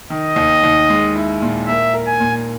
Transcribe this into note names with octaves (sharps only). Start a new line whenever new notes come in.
D#3 D#5
D#2
D#2
G#3
E4
A#2
A#3 E5
A#4
G#5
A#2